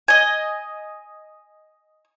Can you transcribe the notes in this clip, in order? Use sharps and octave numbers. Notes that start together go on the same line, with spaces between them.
D#5 G#5